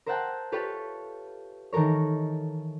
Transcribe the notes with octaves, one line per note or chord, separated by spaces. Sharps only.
A#4 C5 E5 F#5 G5 A5
F4 G4 A4 B4 C#5
D#3 E3 A4 A#4 C#5